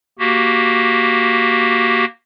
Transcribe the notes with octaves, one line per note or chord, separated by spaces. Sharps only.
A#3 F#4 G4